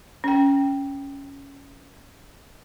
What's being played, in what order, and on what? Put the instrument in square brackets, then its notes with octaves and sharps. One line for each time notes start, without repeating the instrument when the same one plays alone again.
[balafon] C#4 G5